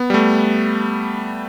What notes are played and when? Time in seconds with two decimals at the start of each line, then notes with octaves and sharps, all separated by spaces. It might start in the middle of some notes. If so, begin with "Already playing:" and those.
Already playing: B3
0.10 G3
0.14 A3